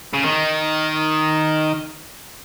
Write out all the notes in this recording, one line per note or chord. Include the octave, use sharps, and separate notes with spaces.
C#3
D#3